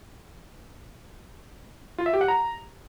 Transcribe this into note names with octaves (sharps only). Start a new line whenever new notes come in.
F4
E5
G4
F#5
A#5